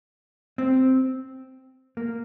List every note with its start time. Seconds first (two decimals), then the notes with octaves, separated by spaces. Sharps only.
0.58 C4
1.97 A#3